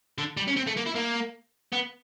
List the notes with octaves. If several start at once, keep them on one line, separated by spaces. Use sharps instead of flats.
D3
G3
C#4
C4
A3
A#3
E4
A#3
B3